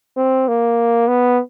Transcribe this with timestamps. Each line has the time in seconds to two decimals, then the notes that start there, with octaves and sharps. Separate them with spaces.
0.17 C4
0.49 A#3
1.08 B3